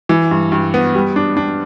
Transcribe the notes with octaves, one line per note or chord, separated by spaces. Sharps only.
E3
G2
G2
B3
G3
D4
D4